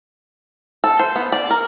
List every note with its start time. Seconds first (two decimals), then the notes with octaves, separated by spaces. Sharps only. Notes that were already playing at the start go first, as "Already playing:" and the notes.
0.84 A4
0.99 C5
1.16 B3
1.32 D5
1.51 A#4